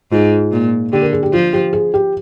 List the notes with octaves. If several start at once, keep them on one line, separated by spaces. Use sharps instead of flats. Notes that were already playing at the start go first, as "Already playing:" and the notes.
G#2 F4
A#2
D3 G4
A#4
G#4
G4
F3 F4
G4
G#4
G4